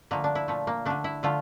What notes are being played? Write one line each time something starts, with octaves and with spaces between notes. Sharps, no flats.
D3 F3 A3 A#3
D4
E4
A#2 F3 A3
A#3
D3 A3 D4
E4
D3 F3 A3 F4